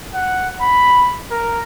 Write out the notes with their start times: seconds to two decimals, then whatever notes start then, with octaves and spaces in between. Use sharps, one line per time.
0.15 F#5
0.61 B5
1.31 A#4